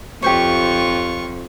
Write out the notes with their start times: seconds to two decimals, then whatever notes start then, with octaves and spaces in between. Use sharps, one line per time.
0.22 F2 F4 G4 C5 C#5 C#6